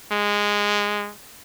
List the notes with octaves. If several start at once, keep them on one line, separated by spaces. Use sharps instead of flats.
G#3